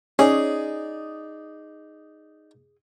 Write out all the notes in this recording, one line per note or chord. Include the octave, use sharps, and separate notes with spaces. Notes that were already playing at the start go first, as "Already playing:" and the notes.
C#4 D#4 G#4 D5